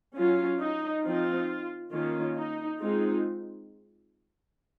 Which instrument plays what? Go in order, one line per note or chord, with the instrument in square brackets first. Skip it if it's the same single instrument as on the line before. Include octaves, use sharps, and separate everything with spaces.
[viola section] F#3 C#4 F4
D#4
F3 C4 D#4 F4
D#3 A#3 C#4 F4
D#4
G#3 C4 D#4 F4